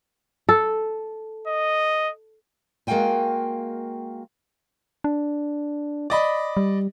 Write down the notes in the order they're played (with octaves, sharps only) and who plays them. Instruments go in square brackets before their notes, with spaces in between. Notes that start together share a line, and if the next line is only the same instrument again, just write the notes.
[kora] A4
[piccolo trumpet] D#5
[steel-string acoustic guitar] G#3 A#3 F#4 F5 G5 G#5
[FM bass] D4
[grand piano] D5 D#5 B5
[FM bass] G3